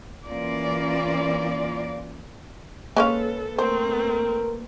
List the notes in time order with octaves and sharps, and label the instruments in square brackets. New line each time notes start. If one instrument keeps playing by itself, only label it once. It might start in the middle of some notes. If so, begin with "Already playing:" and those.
[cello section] E3 A#3 C#4 F4 D5
[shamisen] G#3 C#4 F5 [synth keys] A#3 B4 [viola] A4
[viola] A3 C4 [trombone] A#4 [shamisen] C5